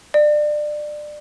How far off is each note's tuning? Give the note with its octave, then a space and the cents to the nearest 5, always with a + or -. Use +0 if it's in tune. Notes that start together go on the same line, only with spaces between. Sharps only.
D5 +25